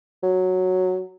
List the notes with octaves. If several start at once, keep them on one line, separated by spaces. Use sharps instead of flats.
F#3